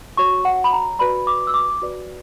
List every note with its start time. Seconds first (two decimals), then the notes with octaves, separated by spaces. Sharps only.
0.17 F#4 C#5 C#6
0.45 F#5
0.64 B5
0.73 A#5
0.99 F#4 B4 D5 B5
1.27 D6
1.47 E6
1.54 D6
1.82 F#4 B4 D5